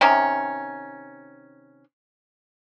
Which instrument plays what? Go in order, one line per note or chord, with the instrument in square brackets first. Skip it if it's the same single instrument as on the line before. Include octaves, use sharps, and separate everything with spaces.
[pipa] C3 D#3 C#4